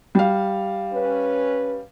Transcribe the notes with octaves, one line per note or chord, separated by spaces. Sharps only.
G3 F5
C#4 B4